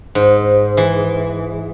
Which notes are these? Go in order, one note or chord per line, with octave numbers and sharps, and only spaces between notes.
G#2
E3